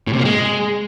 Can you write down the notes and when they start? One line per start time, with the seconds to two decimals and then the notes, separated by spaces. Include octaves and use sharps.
0.07 A2
0.13 C3
0.19 A#3
0.25 G#3